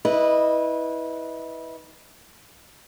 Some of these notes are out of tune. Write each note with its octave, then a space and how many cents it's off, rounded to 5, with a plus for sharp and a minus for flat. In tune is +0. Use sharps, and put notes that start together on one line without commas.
E4 -25 B4 -5 D#5 -20